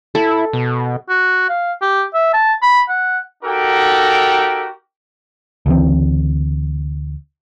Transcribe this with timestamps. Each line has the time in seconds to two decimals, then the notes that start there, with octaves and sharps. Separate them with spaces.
0.15 E4 A4
0.53 B2
1.09 F#4
1.49 F5
1.82 G4
2.14 E5
2.33 A5
2.62 B5
2.89 F#5
3.44 D#4 F#4 G4 A4 A#4 G5
5.66 D2 C#3 E3 C4